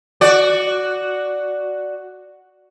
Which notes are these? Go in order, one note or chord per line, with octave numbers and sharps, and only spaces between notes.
F#4 D5